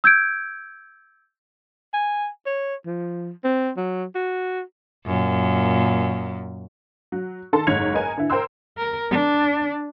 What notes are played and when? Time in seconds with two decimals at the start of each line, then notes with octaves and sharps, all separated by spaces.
0.04 E6 G6 G#6 D7
1.94 G#5
2.46 C#5
2.86 F3
3.44 C4
3.77 F#3
4.15 F#4
5.06 F#2 A#2
7.12 F#3
7.53 D#3 A4 A5 C6
7.67 F#1 G#2 C#5 G#6 C#7 F7
7.94 A#4 B4 D#5 G#5
8.17 D3 E4
8.30 A#4 C5 G5 A#5 C6 E6
8.77 A#4
9.11 D4